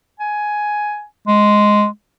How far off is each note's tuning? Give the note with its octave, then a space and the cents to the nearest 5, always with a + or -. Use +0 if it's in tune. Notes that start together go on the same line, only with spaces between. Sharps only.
G#5 +10
G#3 +5